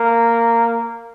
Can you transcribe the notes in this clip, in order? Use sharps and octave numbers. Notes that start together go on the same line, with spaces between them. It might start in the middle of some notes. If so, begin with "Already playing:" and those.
Already playing: A#3